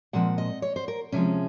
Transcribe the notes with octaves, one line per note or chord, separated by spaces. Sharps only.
A#2 F3 G#3 C4 F#5
D#5
C#5
C5
A#4
C3 F3 G#3 C#4